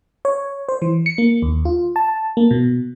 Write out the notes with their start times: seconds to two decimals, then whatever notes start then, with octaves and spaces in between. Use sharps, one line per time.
0.25 C#5
0.69 C5
0.82 E3
1.06 C#7
1.18 A#3
1.42 D#2
1.65 F4
1.96 A5
2.37 A#3
2.51 B2